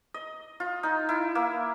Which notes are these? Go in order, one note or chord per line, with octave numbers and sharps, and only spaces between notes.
D#5
F4
D#4
E4
A#3